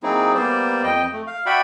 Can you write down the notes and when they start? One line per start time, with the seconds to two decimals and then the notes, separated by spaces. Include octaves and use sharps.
0.03 F#3 A#3 C4 D#4 E4 G#4
0.34 G3 A#3 B3 C5 D5
0.83 F2 D#5 G5
1.13 A3
1.27 F5
1.46 F#4 D5 E5 F#5 G5 B5